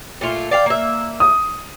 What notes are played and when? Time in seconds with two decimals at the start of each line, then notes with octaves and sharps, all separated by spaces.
0.21 A#2 A3 F4
0.51 D5 F5 G5
0.66 A#3 E5
1.20 D#6